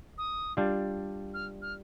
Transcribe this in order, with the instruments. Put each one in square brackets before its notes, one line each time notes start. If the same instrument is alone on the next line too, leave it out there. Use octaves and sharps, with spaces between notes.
[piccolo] D#6
[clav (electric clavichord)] G3 D4 F4
[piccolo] F6
F6